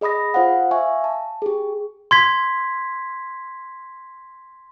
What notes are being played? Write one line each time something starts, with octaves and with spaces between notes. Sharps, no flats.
G#4 D#5 B5 D#6 A#6
F4 C5 F5 F#5
E5 F5 G#5 C#6
A5
G4 G#4
C6 G#6 B6